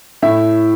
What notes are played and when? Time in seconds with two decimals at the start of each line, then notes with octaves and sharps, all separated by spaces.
0.22 A2 A3 E4 E5